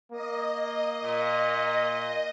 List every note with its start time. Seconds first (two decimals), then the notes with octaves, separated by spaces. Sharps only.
0.12 A#3 D#5
1.04 A#2